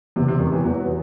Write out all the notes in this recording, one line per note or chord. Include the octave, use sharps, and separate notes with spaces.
E2 C3
C3
E2 D#3
E3
E2 F#3
B3